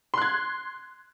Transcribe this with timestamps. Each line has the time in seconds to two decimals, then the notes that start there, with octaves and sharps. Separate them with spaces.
0.14 C6
0.18 F#6
0.22 G#6